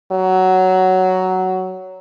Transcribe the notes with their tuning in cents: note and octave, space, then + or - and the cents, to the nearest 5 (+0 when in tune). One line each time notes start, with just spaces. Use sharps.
F#3 +10